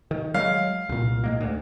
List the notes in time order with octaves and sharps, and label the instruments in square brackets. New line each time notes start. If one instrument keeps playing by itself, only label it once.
[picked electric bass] D#3
[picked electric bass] F#3 G#3 [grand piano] F5
[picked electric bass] C2 A#2
A2 G#3 A#3
D2